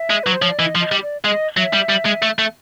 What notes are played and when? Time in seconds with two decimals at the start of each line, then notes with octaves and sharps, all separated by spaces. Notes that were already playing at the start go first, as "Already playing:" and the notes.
Already playing: E5
0.10 G#3
0.23 F#3 B4
0.32 C5
0.41 F3 C#5
0.50 D5
0.59 E3 D#5
0.75 F3
0.80 D#5
0.92 G3
1.02 D5
1.25 G#3 D#5
1.57 F#3 E5
1.74 G3
1.90 G3
2.06 G#3
2.22 A3
2.39 A3